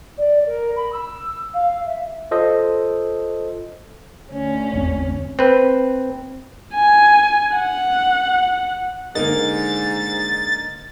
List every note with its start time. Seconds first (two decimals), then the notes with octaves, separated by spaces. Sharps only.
0.17 D5
0.46 A#4
0.76 B5
0.92 E6
1.53 F5
1.86 E5
2.31 F4 A4 C5 D#5
4.30 D2 C#4
4.73 G#1 E2 C4
5.39 C4 B4
6.74 G#5
7.57 F#5
9.15 G#2 D3 A#3 D#4 A#4 A6